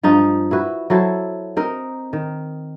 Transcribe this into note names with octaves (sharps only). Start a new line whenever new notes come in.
G2 F3 D#4 F4
E4 F#4 B4
F#3 E4 A4 C5
C4 D#4 A#4
D#3